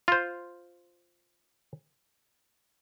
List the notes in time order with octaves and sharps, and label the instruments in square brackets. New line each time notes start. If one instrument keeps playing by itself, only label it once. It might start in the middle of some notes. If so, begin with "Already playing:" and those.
[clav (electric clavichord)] F4 C5